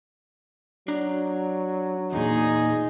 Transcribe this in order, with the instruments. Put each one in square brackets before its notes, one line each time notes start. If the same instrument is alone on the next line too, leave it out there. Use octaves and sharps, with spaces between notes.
[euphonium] F#3 [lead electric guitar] D4 A#5
[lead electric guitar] E2 A#2 [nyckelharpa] D#4 G#4